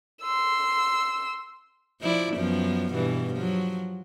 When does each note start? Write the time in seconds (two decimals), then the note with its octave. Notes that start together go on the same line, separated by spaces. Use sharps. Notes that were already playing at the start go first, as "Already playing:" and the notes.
0.22 C6 E6
2.01 F3 E4 D5
2.35 F#2 F3 B3
2.93 G2 B2 E3
3.34 F3 F#3